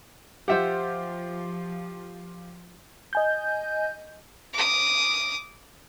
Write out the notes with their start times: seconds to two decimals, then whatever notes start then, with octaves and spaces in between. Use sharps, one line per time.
0.48 F3 F4 G4 C5 E5 F#5
3.13 D#5 G#5 G6
4.54 D6 D#6